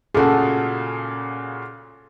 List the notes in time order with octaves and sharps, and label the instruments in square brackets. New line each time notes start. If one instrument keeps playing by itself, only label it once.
[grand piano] A#2 C#3 F#4 [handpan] G#4 A4